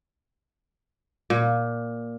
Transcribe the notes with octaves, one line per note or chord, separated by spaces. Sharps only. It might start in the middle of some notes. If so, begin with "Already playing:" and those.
A#2